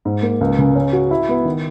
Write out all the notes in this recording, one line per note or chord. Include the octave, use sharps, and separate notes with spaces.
G#2
A#3
C#2
C#3
C#4
F#4
E4
B3
D#3